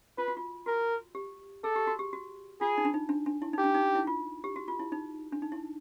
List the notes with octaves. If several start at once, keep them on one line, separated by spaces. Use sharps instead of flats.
F4 B4
F#4
F4
F#4 A#4
G4
G#4 A4
G4
F#4
G4
F#4
F4 G#4
D#4
D4
D#4
D4
D4
E4
D#4 G4
D4
D#4
E4
F4
G4
F#4
F4
E4
D#4
D4
D#4
E4